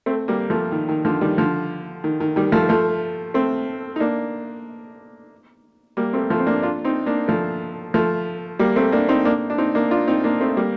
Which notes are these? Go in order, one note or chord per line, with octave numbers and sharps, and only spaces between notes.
A3 C4
G3 A#3
F3 A3
D#3
D#3
D3 F3
D#3 G3
D3 F3
D#3
D#3
D#3 G3
F3 A3
F3 A3
A3 C4
D#4
A#3 D4
G3 A#3
A3 C4
F3 A3
C4
A#3 D4
D4 F4
C4 D#4
A#3 D4
F3 A3
F3 A3
G3 A#3
A3 C4
A#3 D4
C4 D#4
A#3 D4
D4
C4 D#4
A#3 D4
D4 F4
C4 D#4
A#3 D4
A3 C4
G3 A#3